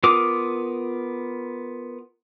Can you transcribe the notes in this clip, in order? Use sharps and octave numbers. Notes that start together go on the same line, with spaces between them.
B3 F4 A#4 D6 D#6